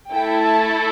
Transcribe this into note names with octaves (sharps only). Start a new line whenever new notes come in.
A3 E4 A4 G5
A5